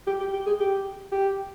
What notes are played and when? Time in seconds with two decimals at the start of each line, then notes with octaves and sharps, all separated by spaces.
0.07 G4
0.20 G4
0.33 G4
0.46 G#4
0.60 G4
1.12 G4